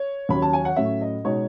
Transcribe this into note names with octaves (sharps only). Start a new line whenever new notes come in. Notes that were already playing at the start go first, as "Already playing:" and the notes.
Already playing: C#5
D#2 C#3 F#3 B5
A5
G#5
F#5
A2 F#3 C#4 E5
D#5
B2 G#3 D#4 C#5